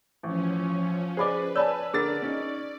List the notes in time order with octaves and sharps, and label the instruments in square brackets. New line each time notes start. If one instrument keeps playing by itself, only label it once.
[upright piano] A1 [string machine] F3 C#4
[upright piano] G#4 D5 [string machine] B4 [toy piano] C5 B5 D6
[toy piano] C#5 D5 B5 [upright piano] G#5 A5 E6
[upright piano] D3 A#4 A6 [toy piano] G#4 F#5 [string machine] D5
[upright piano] C#4 D#4